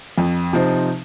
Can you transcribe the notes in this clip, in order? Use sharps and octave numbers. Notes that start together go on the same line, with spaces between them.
F2
C3 F3 C4 D#4